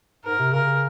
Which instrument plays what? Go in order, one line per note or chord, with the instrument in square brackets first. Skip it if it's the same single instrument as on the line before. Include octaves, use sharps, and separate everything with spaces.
[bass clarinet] G#2 [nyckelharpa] A#4
[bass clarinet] C3
[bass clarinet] C#3 [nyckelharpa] A#4